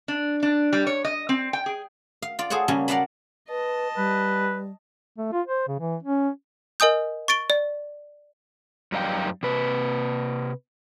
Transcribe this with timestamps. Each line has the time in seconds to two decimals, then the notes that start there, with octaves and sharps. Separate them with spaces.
0.08 D4
0.43 D4
0.73 G3
0.87 C#5
1.05 D#5
1.29 C4
1.53 G5
1.66 G#4
2.22 F5
2.39 F4 D5
2.50 G#4 A4 C5 C#5 F#5
2.68 C#3 F#3 G3 A#3 C#4
2.88 A#4 D5 F5 F#5 A5 B5
3.49 B4 D#5 A5
3.97 G3 B4
5.18 A3
5.32 F4
5.47 C5
5.68 C#3
5.80 E3
6.03 C#4
6.80 A#4 D#5 G#5 D#6 G6
7.28 C#6 A6 D7 G7
7.50 D5
8.92 F#2 G3 D#4 F5 G5
9.43 C3 B4